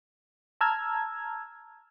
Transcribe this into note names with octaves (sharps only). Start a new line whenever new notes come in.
A5 A#5 E6 F6 G#6